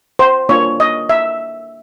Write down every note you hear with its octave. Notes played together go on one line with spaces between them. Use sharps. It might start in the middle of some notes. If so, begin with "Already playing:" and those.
C5
A#3 D4 F4 C#5
D#5
E5